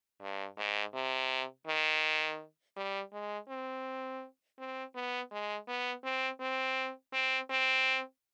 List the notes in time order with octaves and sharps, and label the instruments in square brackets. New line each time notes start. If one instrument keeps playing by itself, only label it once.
[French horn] G2
G#2
C3
D#3
G3
G#3
C4
C4
B3
G#3
B3
C4
C4
C4
C4